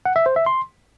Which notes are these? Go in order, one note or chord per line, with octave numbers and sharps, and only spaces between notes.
F#5
E5
C5
E5
C6